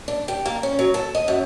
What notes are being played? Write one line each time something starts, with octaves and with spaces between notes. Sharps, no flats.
D4
G4
A#3
C#4
F#3
A4
D#5
F#2